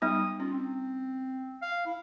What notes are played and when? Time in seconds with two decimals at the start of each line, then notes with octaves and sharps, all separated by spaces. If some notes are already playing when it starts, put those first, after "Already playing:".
0.02 G3 B3 D#4 D#6
0.40 C#4 F4
0.53 C4
1.62 F5
1.86 E4